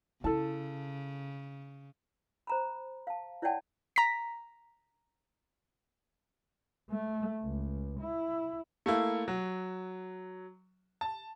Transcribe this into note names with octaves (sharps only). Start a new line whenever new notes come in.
C#3 E4 A4 A5
C5 A#5 B5
F5 A5
E4 C#5 D5 F#5 G5 A5
A#5 B6
A3
C#2
E4
A3 A#3 E4
F#3
A5